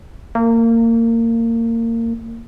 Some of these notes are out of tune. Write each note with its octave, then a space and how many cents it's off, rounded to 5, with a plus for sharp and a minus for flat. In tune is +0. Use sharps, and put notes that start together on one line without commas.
A#3 -25